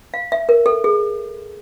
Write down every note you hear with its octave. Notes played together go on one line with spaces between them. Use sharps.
F5
E5
A#4
A4
G#4